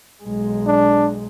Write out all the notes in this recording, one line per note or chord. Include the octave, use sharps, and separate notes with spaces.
B1 G#3
D4